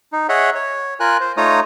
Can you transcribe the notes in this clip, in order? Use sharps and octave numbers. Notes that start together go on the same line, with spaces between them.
D#4
G#4 C#5 D#5 E5 F#5
C#5
F4 A#4 G#5 F#6
C5
A3 D#4 F4 C#5 A#5 D#6